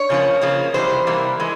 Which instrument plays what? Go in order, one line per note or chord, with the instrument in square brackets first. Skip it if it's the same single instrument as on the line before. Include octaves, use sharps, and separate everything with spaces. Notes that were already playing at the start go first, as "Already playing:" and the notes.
Already playing: [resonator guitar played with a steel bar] C#5
C#3 F3 A#3
C#3 F3 A#3
C3 E3 G3 A#3 C5
C3 E3 G3 A#3
E3 G#3